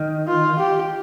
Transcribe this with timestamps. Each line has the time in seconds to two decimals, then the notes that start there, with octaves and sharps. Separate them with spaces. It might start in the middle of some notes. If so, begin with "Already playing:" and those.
Already playing: D#3
0.28 F4
0.59 G4